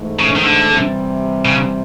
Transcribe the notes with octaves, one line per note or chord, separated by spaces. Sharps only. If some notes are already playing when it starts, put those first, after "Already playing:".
Already playing: G#2 E3 A3
C#3
D#3
D3
C3 E3 G3
C#3